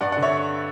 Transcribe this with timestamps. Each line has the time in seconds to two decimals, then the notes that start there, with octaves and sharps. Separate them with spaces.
0.01 G2 D5 F#5
0.12 D5 F#5
0.17 D3
0.22 C#5 E5